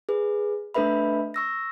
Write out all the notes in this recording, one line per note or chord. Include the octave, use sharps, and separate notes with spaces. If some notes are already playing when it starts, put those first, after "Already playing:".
G#4 B4
A3 D4 A4 B4 E5 B5
C#6 E6 A#6